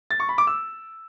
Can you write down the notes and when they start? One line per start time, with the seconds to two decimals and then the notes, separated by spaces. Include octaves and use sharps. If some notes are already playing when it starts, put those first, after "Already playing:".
0.11 A6
0.20 C#6
0.29 B5
0.38 D6
0.47 E6